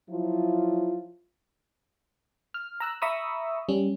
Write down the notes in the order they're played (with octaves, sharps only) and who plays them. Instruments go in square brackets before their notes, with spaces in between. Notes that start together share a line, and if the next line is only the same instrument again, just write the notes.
[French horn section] F3 F#3 E4 F4
[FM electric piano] F6
A#5 E6 F#6
E5 A#5 B5 C#6 D#6 E6
G3 C#4